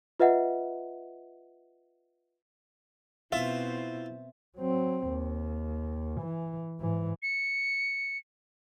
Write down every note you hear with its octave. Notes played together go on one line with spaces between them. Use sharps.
F4 B4 D#5 E5 F#5
B2 C4 E4 F4 C5 E5
F#3 C4
D#2
E3
G#2 E3
C#7